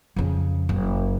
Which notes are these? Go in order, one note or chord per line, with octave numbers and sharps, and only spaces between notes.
F2 C#3
F#1